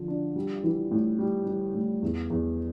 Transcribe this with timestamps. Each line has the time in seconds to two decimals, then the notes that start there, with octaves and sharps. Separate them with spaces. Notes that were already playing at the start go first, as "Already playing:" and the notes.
Already playing: D3 F3
0.08 D4
0.36 G3
0.64 E3
0.91 A2
1.19 G3
1.46 G3
1.75 A2
2.02 E2
2.30 E2